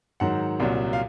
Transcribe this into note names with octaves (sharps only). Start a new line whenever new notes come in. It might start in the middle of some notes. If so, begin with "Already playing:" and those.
G#2 D#3 F#3 F#5
C2 A#2 F#3
F5